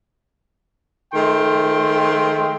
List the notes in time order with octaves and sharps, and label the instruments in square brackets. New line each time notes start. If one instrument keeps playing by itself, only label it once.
[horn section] D#3 F3 G#3 A3 G5 C6